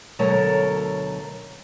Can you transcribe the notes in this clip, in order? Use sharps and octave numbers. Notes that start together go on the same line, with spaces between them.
D2 B2 F#3 A4 A#4 C#5